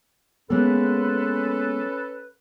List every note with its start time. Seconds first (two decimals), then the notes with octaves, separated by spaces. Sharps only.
0.50 G#3 A#3 B3 C#4 A4 B4